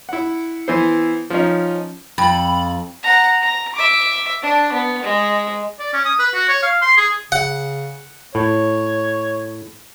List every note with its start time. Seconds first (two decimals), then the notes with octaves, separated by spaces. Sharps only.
0.09 E4 F#5
0.68 E3 B3 E4 C5
1.30 F3 C#4 D#4
2.18 F2 B5
3.03 F#5 A#5
3.41 A#5
3.75 E5 D6
4.42 D4
4.72 B3
5.03 G#3
5.80 D5
5.93 C#4
6.05 D#6
6.19 B4
6.34 F#4
6.49 C#5
6.63 F5
6.82 C6
6.98 G#4
7.32 C#3 F#5
8.35 A2 C#5